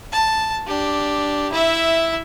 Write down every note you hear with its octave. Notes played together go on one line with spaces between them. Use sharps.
A5
D4 G4
E4 E5